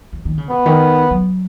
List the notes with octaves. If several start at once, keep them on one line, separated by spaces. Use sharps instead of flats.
E3
D#3
C#3
B2 B3
D#3
F#3